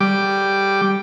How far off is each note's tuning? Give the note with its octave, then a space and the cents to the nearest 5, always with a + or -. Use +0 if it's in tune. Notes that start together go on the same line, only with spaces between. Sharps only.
G3 +0 D6 +0